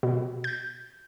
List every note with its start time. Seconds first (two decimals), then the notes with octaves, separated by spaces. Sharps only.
0.03 B2
0.44 G6